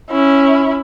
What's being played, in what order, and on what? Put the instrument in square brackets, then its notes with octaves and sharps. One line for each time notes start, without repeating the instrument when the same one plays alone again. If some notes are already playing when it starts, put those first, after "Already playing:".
[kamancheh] C#4 E4